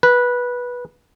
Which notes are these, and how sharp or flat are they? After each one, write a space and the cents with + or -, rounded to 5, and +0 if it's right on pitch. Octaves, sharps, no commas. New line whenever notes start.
B4 -15